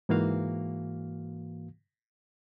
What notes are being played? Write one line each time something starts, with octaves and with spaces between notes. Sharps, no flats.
G#2 E3 A#3 F#4 F5